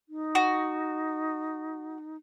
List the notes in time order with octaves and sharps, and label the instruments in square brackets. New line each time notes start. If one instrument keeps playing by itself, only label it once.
[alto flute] D#4
[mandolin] F#4